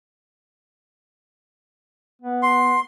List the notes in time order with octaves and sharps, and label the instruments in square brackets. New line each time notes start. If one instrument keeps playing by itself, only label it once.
[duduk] B3
[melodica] C6